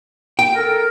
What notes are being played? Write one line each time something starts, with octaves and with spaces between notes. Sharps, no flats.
G5
A4 A#4